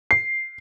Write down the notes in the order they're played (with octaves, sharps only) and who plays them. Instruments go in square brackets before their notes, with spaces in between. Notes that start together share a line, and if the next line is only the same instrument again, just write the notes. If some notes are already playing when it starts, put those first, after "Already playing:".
[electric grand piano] C7